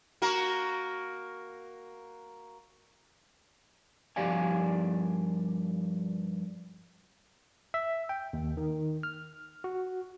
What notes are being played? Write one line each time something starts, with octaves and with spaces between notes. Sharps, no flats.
A#3 F#4 A#4
G2 F3 G4 D5 F5 G#5
E5
G5
D#2
D#3
F6
F#4